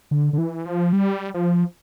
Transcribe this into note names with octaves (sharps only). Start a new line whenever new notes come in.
D3
D3
E3
F3
G3
F3